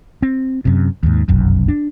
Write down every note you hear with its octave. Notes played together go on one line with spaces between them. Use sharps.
C4
F#2 C3
D#2 G#2
F1 B1 F#2
D4